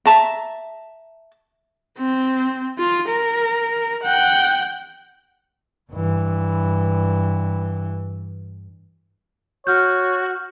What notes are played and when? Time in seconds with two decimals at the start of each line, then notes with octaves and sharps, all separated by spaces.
0.06 E5 A5 A#5
1.98 C4
2.78 F4
3.08 A#4
4.03 F#5 G5
5.92 G2 E3
9.67 F#4 C#5 F6 G6